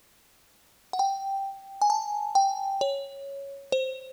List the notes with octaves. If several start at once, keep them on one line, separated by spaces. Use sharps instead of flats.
F#5
G5
G#5
A5
G5
C#5
C5